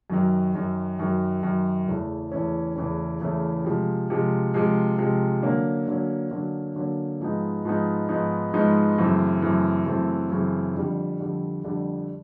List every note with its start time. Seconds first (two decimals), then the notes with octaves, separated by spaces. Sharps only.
0.10 F#2 D#3 F#3
0.54 F#2 D#3 F#3
0.99 F#2 D#3 F#3
1.43 F#2 D#3 F#3
1.88 E2 C#3 E3 A3 C#4
2.32 E2 C#3 E3 A3 C#4
2.76 E2 C#3 E3 A3 C#4
3.21 E2 C#3 E3 A3 C#4
3.64 C3 F3 G#3
4.10 C3 F3 G#3
4.54 C3 F3 G#3
4.98 C3 F3 G#3
5.42 D3 F#3 A#3 C#4
5.87 D3 F#3 A#3 C#4
6.31 D3 F#3 A#3 C#4
6.76 D3 F#3 A#3 C#4
7.20 G#2 F3 G#3 B3 D#4
7.65 G#2 F3 G#3 B3 D#4
8.09 G#2 F3 G#3 B3 D#4
8.54 G#2 F3 G#3 B3 D#4
8.98 F#2 C#3 E3 A3 C4
9.42 F#2 C#3 E3 A3 C4
9.86 F#2 C#3 E3 A3 C4
10.31 F#2 C#3 E3 A3 C4
10.75 F2 D3 G3
11.20 F2 D3 G3
11.64 F2 D3 G3